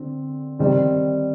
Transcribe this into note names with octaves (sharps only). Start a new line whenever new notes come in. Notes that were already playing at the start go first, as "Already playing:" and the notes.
Already playing: D3 C4
D#3 G3 C4